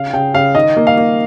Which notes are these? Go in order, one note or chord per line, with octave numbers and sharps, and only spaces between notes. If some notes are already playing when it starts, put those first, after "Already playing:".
Already playing: C#3 F5
C#3 G5
C#3 F5
D#3 D#5
A#3
F5
A#3